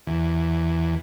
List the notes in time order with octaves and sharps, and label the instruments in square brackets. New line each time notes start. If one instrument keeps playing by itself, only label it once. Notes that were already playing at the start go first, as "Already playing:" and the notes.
[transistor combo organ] E2